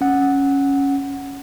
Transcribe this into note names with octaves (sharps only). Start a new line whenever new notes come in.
C#4 F#5